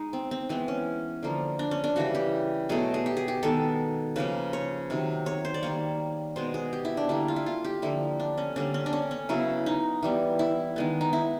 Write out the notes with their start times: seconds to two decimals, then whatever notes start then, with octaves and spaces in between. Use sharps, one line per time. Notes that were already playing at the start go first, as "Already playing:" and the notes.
Already playing: G#3 D#4
0.13 C4
0.31 C4
0.49 E3 G#3 B3 C4
0.68 C#4
1.23 D3 F3 A#3
1.59 D4
1.71 C#4
1.84 D4
1.96 C#3 E3 G3 F#4
2.15 G4
2.69 B2 F#3 A3 G#4
2.94 G#4
3.06 G4
3.17 G#4
3.28 G4
3.43 D#3 G#3 B3 A4
4.16 C#3 F3 A#3 B4
4.53 C#5
4.90 C3 D#3 F#3
5.26 C#5
5.45 C5
5.54 D5
5.63 D#3 G3 A#3 C#5
6.36 B2 G#3 B3 C5
6.54 G#4
6.73 G4
6.85 E4
6.97 D4
7.09 D3 G3 A#3 E4
7.28 F4
7.36 E4
7.46 F4
7.65 G4
7.82 D3 F3 A#3 E4
8.20 D4
8.38 C#4
8.56 D3 G3 A#3 C#4
8.74 C#4
8.86 D4
8.93 C#4
9.11 C#4
9.29 C#3 F#3 B3 E4
9.66 D#4
10.03 E3 G3 B3
10.39 E4
10.76 D#3 G#3 B3
11.01 D#4
11.13 E4